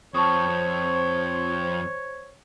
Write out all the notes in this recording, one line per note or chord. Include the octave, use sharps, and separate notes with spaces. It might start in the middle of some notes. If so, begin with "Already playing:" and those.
F2 C4 C5 C#5 A5 C#6 D#6